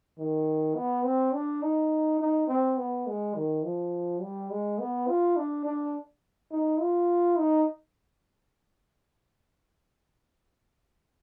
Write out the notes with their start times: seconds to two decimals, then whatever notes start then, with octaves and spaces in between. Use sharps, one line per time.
0.18 D#3
0.76 B3
1.05 C4
1.34 D4
1.62 D#4
2.19 D#4
2.48 C4
2.77 B3
3.07 G#3
3.35 D#3
3.63 F3
4.21 G3
4.50 G#3
4.79 B3
5.08 F4
5.36 D4
5.65 D4
6.51 D#4
6.80 F4
7.38 D#4